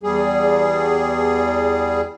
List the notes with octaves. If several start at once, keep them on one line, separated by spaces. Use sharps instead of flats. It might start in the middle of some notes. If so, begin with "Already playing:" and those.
E2 G3 G#4